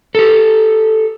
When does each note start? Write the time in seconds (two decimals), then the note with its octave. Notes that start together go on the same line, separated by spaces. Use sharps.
0.15 G4 A4